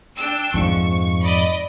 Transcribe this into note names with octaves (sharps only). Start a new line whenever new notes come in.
D4 G5 E6
F2 G#2 F3 C#6
D5 D#5 B5